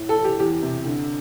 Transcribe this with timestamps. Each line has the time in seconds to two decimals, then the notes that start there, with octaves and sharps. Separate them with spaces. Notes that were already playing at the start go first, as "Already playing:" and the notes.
Already playing: A2
0.09 A4
0.17 E3
0.24 G4
0.39 E2 G4
0.62 C3
0.85 D3